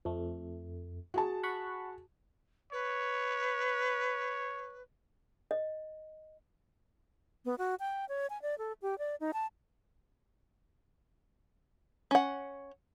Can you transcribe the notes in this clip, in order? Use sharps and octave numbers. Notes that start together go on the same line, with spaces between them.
F2 A3
F#4 G#4 A5
F#5 B5 C#6
B4 C#5
D#5
B3
F#4
G5
C#5
G#5
D5
A4
G4
D5
D#4
A5
C#4 F#5